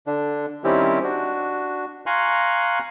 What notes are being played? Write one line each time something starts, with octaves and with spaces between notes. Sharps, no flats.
D3 D4
D#3 G3 C4 C#4 E4 G4
D4 F#4
F5 G#5 A#5 C6 C#6 F#6